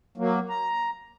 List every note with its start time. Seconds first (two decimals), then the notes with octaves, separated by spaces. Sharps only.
0.18 F#3 A#3
0.49 A#5